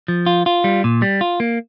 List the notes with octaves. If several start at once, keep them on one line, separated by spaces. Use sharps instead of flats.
F3
F4
F4
G3
A#2
G3
F4
A#3